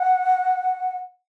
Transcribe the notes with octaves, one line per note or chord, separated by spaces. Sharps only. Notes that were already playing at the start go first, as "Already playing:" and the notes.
Already playing: F#5